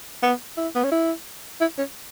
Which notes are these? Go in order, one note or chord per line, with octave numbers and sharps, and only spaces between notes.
B3
E4
B3
C#4
E4
E4
C#4